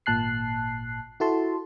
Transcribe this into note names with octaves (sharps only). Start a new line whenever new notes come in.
G#1 A#2 A5 F#6 C7
E4 F#4 A4 A5 C6